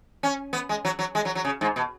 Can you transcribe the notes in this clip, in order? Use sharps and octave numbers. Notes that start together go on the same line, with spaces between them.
C#4
B3
G#3
F#3
F#3
G#3
F#3
F#3
C#3
G#2
B2